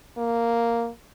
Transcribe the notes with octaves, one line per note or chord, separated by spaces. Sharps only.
A#3